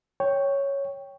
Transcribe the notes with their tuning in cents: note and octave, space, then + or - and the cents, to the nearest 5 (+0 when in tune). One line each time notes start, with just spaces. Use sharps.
C#5 +0 G5 +0